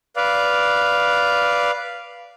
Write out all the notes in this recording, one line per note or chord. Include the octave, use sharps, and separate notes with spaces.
B4 D5 F5